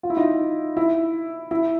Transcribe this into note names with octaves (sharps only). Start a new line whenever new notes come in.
F4
E4
D#4 F4
E4
E4